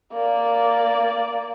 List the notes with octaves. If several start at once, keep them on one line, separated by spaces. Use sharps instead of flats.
A#3 D5